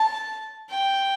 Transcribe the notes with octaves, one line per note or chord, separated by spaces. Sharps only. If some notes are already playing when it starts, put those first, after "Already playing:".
Already playing: A5
G5